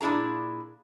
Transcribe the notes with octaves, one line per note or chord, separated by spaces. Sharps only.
A#2 D4 E4 G#4 A#5